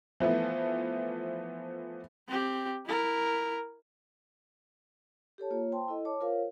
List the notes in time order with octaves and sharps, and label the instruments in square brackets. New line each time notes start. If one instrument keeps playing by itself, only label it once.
[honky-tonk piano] E3 F3 A3 B3
[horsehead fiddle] C4 G4
E4 A#4
[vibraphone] G4 A4 C#5 A5
A#3 F4 C#5
C5 G5 A5 C6
E4 A4 D#5
C#5 A5 D6
F4 A#4 C5 C#5 F5